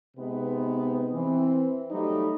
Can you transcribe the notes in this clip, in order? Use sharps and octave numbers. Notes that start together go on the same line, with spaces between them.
C3 G#3 B3 D#4 B4
E3 C4
F#3 G3 A3 D#4